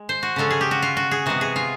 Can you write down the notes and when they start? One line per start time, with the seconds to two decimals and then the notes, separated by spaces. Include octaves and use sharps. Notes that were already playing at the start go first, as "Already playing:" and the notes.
Already playing: G#3
0.09 C5
0.23 F#4
0.36 C#3 F3 G#3 C#4 A4
0.50 G#4
0.61 G4
0.71 F#4
0.82 F4
0.97 F#4
1.11 G#4
1.26 C3 E3 G#3 B3 F#4
1.41 G#4
1.56 F4